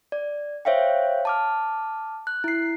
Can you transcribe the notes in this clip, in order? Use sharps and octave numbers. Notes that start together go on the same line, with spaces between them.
D5
C5 C#5 E5 F5 G5
A5 D6 F6
F#6
E4 C7